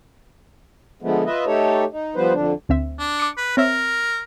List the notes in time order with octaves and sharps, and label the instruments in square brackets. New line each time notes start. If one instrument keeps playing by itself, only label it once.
[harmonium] D3 F3 G#3 A3 B3
F4 B4 D#5 E5
A3 D#4 G4 A4 C#5
D#4
F3 G3 B3 B4 C5
F2 D3 D4
[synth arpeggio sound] D2 C4 E5
[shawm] D4
[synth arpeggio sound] D6 C#7
[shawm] B4
[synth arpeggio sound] C4 C#5 E5 [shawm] A#4